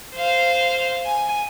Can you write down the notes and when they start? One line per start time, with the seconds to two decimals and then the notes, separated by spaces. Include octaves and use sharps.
0.15 C5 F5
1.05 G#5